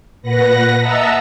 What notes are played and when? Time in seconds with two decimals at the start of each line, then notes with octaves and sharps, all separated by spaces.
0.22 A#2 B4 F#5 A#6
0.79 D#5 E5 F#5 A5 A#5 E6